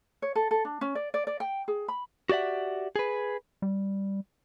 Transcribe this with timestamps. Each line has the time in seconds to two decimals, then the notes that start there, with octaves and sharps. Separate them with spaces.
0.22 C#5
0.35 A4
0.51 A4
0.65 D4
0.81 C#4
0.95 D5
1.14 D5
1.27 D5
1.40 G5
1.68 G#4
1.88 B5
2.29 F#4 G4 D5 E5 F#5
2.96 G#4 B4
3.62 G3